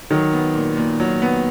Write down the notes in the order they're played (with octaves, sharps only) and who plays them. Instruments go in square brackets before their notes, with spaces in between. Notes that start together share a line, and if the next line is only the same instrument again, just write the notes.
[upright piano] D#3 [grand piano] F#3
[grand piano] B3
A#2
A#2
F#3
B3